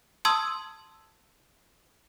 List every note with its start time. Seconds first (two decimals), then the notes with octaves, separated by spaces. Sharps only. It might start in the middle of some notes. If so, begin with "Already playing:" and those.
0.25 A5 C6 D#6 E6 G#6